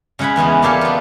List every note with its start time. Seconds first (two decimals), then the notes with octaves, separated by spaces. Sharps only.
0.19 C#3 G#3 F#5 G#5 B5
0.36 E2 E3 B3 C#4
0.62 A#3 D4 G4 A4 C#5 F5
0.81 B3 F4